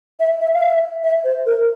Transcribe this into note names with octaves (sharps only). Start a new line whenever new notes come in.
E5
E5
F5
E5
E5
C5
A#4